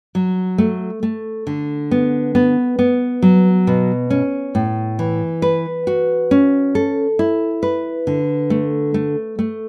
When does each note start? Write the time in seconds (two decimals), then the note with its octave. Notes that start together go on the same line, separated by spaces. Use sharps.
0.15 F#3
0.58 A3
1.03 A3
1.47 D3
1.91 B3
2.35 B3
2.79 B3
3.22 F#3
3.67 B2
4.10 C#4
4.55 A2
4.99 E3
5.42 B4
5.87 F#4
6.31 C#4
6.75 A4
7.19 E4
7.63 B4
8.07 D3
8.50 A3
8.94 A3
9.39 A3